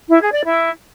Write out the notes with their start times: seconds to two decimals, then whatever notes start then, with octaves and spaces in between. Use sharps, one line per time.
0.09 E4
0.21 G#4
0.33 D5
0.45 E4